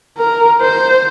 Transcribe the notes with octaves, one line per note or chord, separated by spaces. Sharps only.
A#4
C5